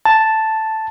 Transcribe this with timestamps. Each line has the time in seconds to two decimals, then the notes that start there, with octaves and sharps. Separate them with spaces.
0.06 A5